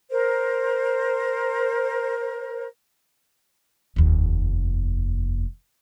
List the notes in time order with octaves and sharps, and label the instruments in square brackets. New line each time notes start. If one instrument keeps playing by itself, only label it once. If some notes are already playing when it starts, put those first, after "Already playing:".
[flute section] A#4 C5
[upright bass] F1 D#2